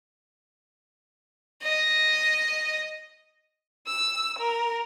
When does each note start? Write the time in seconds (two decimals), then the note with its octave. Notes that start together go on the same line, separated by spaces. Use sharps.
1.62 D#5
3.87 E6
4.39 A#4